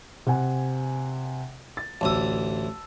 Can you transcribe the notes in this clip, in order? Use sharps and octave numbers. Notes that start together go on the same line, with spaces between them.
C3 F#5 G#5
A6
A1 D2 A5 D#6 E6